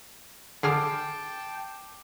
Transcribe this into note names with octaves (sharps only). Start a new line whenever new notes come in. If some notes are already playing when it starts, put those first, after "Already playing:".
D3 G#4 G5 A5 D6 F6 C7